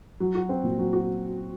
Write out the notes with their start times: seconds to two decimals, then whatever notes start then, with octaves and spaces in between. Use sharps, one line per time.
0.20 F#3
0.35 F#4
0.49 C4
0.64 A#2
0.78 F#3
0.93 F#4